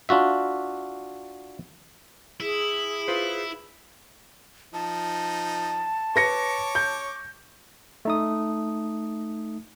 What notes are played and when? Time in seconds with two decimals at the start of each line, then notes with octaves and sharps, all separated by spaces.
0.09 D4 F4 F#4 E5
2.40 E4 G#4
3.08 F4 B4 C5
4.74 F3 D#4 A5
6.16 B4 C#5 C#6 D6 A#6 C#7
6.75 G6
8.05 A3 D#4 D#6